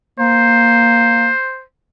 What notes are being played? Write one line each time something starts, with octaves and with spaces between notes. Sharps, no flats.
A#3 C5